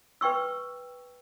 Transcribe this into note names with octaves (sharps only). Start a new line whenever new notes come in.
B4 G5 C#6 E6